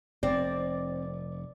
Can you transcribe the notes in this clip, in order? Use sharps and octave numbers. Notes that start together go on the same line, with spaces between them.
F1 C4 D5